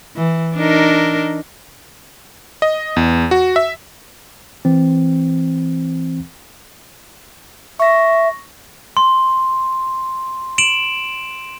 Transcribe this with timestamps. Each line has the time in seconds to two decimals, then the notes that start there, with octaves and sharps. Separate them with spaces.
0.16 E3
0.56 D4 D#4 A#4
2.62 D#5
2.96 E2
3.31 F#4
3.56 E5
4.65 E3 C4
7.80 E5 C#6 A#6
8.97 C6
10.58 D7 E7 F#7